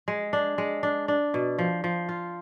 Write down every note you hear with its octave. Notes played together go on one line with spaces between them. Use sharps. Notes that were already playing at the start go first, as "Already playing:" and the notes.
G#3
D4
G#3
D4
D4
B2
F3
F3
F4